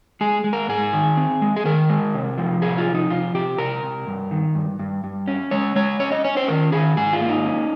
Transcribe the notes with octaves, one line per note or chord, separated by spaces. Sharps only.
G#3 G#4
G#3
A#4
G#2 G#4
D#3
C4
G#3
G#4
D#3 A#4
G#3
C3
F3
C3 G#4
F4
F3
D#4
C3 F4
C3 G4
C3 A#4
C3
G2
D#3
G2
G2
G2
C#4
G#3 C#5
G#3 C#5
C#4 C#5
D#5
C#4 C#5
C5
D#3 A#4
D#3 G#4
G#2 G#4
F4
A#3
D#4
C#4